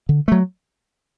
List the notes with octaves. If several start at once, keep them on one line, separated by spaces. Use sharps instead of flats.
D3
F#3 A3